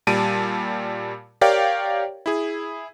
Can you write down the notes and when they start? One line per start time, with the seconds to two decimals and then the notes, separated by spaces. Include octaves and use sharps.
0.07 A#2 G3 A5 D7 D#7
1.41 G4 A#4 C#5 D5 F5 G5
2.26 E4 G#4